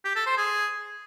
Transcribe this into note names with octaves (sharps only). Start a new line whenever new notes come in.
G4
A4
C5
G#4